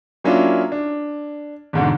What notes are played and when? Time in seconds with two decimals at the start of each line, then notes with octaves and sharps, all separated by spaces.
0.24 F#3 A#3 C#4 D4 E4 F4
0.72 D4
1.73 G#1 E2 G#2 B2 D3